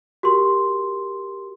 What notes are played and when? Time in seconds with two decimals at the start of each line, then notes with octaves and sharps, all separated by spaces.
0.23 F#4 G4 A#4 C6